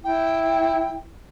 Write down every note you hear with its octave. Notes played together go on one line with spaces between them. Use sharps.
E4 G5